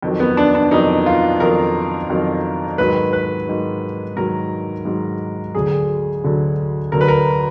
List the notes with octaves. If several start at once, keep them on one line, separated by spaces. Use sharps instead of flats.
F2 D#3 F#3
B3
D4
D4
F2 D#3 F#3 D#4
F4
F2 D#3 F#3 A#4
F2 D#3 F#3
G#2 D#3 F#3 B4
B4
G#2 D#3 F#3
G#2 D#3 F#3 A#4
G#2 D#3 F#3
D2 D3 F#3 G#4
D2 D3 F#3
D2 D3 F#3 A#4
B4
A#4